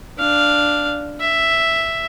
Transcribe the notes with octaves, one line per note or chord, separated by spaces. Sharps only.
D4 F5
E5